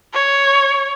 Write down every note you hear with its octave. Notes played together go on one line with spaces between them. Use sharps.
C#5